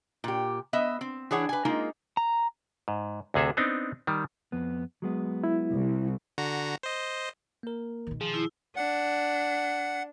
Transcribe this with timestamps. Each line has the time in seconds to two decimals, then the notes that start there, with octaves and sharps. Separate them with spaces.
0.24 A#2 G4
0.73 B3 D#5 E5
1.01 C4
1.31 E3 D4 G#4 C#5 F#5
1.49 B4 G#5
1.65 G#3 A#3 D#4 F4
2.17 A#5
2.88 G#2
3.34 D2 C3 G#4 A4 E5
3.57 B3 C4 D4 D#4
4.07 D#3 G3
4.52 F2 B3
5.02 F#3 G#3 B3
5.44 E4
5.74 C2
6.38 D3 F#4 A#5
6.83 C5 D#5
7.63 A#3 A#4
8.07 B2 D#3
8.21 F3 G#4
8.34 E4
8.76 D4 F#5